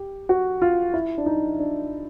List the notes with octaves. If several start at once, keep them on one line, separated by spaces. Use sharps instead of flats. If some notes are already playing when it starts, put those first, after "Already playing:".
Already playing: G4
F#4
F4
E4
D4
D#4
D4